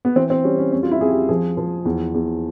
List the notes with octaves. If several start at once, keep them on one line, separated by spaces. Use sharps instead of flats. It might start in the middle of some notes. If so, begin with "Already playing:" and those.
B3
E3 C4
C4
G3 C#4
C#4
F2 C#4
F4
E4
F2 G#4
G4
F3 G#4
F3
E2
E2